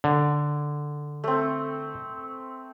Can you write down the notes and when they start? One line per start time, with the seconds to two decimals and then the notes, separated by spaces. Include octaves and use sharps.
0.04 D3
1.24 A3 C4